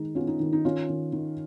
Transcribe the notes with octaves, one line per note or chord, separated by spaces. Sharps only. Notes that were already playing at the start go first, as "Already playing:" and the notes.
Already playing: D#3 G#3 D#4
B3 C#4 F4
D#4
D#3
D#4
D#3 C#4 F4
D#3
D#3